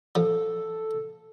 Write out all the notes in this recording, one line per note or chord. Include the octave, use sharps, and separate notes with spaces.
F3 A4